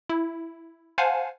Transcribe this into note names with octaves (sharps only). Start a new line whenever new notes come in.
E4
C5 F5 F#5 G#5 A5